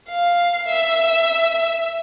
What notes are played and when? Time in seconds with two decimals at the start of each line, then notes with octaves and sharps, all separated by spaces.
0.09 F5
0.68 E5